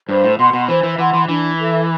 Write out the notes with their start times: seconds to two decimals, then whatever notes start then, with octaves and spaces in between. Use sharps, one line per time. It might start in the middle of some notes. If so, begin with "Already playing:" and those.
0.09 G2 C5
0.24 A2
0.38 B2 F#5 C6
0.53 B2
0.68 E3 C5
0.83 E3
0.98 E3 F#5 C6
1.14 E3
1.28 E3 D4
1.59 A4 E5